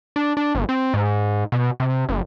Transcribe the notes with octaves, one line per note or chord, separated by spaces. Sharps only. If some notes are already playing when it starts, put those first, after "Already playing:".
D4
D4
G1
C4
G#2
B2
C3
F#1